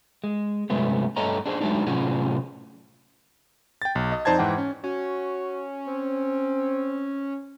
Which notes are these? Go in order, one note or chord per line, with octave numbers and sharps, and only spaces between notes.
G#3
G2 C3 F#3 G#3 A3 B3
G2 A3 A4 C#5 D#5 A#5
D4 G#4 C5
F#3 G#3 A3 D4 D#4
A2 C3 F#3 C#4 F4 G#4
G5 A6
B1
D#5
F2 D#4 C5 D5 A5 G#6
G#2 E3 F#5 G5
C#4
C#4 F#4
C4